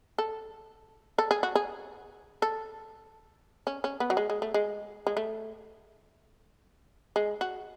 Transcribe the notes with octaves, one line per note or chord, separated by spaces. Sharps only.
A4
A4
G#4
F#4
G#4
A4
C#4
C#4
B3
F#3
G#3
G#3
A3
G#3
G#3
A3
G#3
F#4